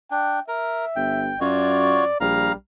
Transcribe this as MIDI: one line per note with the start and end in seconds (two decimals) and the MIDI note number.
0.11 0.40 62
0.11 0.40 79
0.48 0.85 70
0.48 1.25 76
0.96 1.32 31
0.96 1.40 79
1.41 2.08 42
1.41 2.04 65
1.41 2.04 66
1.41 2.04 73
1.41 2.18 74
2.20 2.51 34
2.20 2.55 55
2.20 2.52 77
2.20 2.52 82